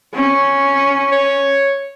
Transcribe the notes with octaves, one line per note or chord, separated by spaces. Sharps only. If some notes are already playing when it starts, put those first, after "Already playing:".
C#4
C#5